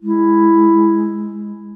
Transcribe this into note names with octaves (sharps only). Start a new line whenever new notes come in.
G#3 E4